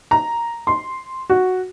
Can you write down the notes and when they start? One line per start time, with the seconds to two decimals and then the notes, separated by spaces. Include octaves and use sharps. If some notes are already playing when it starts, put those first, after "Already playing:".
0.11 A#5
0.67 C6
1.30 F#4